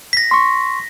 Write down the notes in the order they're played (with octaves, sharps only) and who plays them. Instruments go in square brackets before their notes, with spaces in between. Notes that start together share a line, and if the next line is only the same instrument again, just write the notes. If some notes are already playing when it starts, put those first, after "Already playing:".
[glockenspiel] A#6 B6
[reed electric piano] C6 C#6